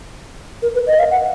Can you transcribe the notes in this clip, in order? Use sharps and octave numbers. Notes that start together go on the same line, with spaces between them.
A#4
B4
D#5
F5
F#5